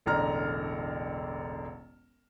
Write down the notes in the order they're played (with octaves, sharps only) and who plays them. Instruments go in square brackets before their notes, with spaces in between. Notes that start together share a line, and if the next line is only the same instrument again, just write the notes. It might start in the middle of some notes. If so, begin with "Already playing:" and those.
[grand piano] E1 A1 D3 A#5 F6